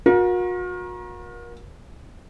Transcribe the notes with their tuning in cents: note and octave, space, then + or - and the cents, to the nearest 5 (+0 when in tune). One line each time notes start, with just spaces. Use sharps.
F#4 -40 A#4 +30